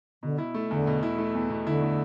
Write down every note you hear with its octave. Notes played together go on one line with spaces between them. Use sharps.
B2 D3
E4
A3
E2 D3
B2
E4
A3
E2
B2
D3 E4
A3